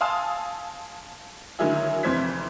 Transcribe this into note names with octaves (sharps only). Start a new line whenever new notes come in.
F5 G#5 A5 C6 D#6 E6
D3 D#3 F#3 A#3 E4 G#4
F1 F2 E3 C5 G#6 B6